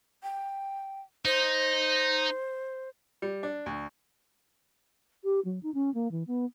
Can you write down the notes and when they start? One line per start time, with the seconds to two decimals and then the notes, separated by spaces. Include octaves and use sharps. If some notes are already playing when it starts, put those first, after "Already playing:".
0.23 G5
1.25 D#4 C5
3.22 G3
3.43 D4
3.66 D2
5.24 G4
5.45 F#3
5.63 D#4
5.74 C#4
5.94 A#3
6.11 E3
6.27 B3